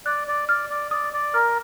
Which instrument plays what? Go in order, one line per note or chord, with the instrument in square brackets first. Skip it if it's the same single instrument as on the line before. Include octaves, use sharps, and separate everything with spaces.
[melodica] D5 [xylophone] F#6
[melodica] D5
[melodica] D5 [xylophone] F6
[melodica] D5
[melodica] D5 [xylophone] D#6
[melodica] D5
[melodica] A#4 [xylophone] F6